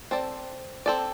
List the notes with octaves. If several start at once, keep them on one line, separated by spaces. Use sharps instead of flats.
C4 A4 D5
C4 A4 D5